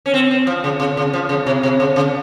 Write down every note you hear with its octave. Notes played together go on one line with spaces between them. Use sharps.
C#4
C4
C4
F3
C#3
C#3
C#3
F3
C#3
C3
C3
C#3
C#3